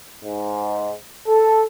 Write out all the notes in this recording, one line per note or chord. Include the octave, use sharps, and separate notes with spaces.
G#2
A4